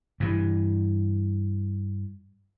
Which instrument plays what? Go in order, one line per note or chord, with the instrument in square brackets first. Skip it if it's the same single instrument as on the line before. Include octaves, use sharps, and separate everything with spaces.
[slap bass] G2 E3